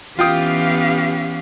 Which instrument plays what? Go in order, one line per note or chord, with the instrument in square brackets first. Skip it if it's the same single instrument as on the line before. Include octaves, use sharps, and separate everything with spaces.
[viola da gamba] E3 B3 C#4 [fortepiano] F4 G5 D#6 [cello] G4 F5